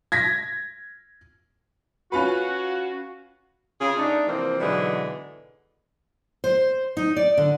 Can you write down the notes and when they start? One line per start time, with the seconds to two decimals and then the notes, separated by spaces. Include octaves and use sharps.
0.12 G#6 A#6 B6
2.12 C#4 F4 F#4 B4
3.80 C#3 F4 G#4
3.97 A3 D4 D#4
4.27 C3 E3 F3 A#3 C4
4.60 G#2 B2 D3 E3 F#3 G#3
6.44 C5
6.97 D#4
7.16 D5
7.37 D3